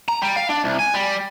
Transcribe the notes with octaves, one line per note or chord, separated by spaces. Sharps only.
A#5
G3
F5
D4
C2
G#5
G3